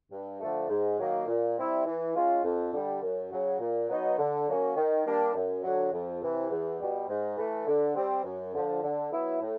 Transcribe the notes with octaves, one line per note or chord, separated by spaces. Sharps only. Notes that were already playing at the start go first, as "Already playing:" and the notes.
G2
D3 F3 A3
G#2
D#3 F#3 A#3
A#2
G3 C4 E4
E3
G#3 C#4 F4
F2
D3 G3
F#2
C#3 F#3
A#2
F#3 B3 D#4
D3
F#3 A#3 C#4
D#3
G3 A#3 D4
F#2
D3 F#3
F2
C3 E3
E2
B2 G3
G#2
E3 A3
D3
G3 C4
F#2
D3 F3
D3
F#3 B3 E4
A2